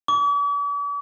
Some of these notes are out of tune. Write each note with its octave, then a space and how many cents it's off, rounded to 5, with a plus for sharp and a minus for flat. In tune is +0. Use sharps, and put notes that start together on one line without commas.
D6 -45